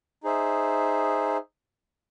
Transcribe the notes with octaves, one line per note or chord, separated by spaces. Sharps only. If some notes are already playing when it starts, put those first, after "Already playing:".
D#4 G#4 C5 E5